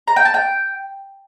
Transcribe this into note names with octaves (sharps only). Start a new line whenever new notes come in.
A#5
G5
A5
G5